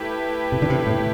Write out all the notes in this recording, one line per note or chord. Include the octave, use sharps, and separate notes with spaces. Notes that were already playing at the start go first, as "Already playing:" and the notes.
Already playing: A3 E4 G4 B4
C3
D3
C3
A2